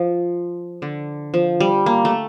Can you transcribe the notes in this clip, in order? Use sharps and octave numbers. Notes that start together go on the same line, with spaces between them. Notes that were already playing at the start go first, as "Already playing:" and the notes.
Already playing: F3
D3
F3
G3
A#3
A3